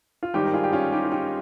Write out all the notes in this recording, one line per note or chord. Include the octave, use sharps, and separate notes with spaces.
F4
G#1 G2 D#3 G3 D#4 G4
A#4
F4 G#4
G4
C#4 F4
D#4 G4
F4
D#4 G4